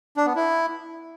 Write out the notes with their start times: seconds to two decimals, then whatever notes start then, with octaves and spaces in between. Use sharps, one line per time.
0.17 D4
0.26 B3
0.36 E4